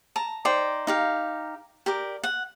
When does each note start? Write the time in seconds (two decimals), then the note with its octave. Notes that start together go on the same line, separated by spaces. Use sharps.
0.16 A5 A#5
0.45 D#4 C5 D5 G5
0.87 D#4 G4 F5
1.86 G4 A#4 D5
2.24 F#5